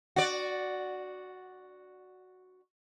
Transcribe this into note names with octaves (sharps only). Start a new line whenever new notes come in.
F#4 D5